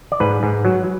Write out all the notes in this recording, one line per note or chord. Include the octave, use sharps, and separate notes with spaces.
D5
G#2 B4
G#2
F#3